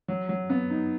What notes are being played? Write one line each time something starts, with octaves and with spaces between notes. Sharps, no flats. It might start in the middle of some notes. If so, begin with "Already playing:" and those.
F#3
F#3
B3
D#4